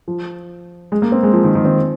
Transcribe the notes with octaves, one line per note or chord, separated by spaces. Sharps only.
F3
G#3
A#3
C4
G#3
F3
D#3
D#3
C4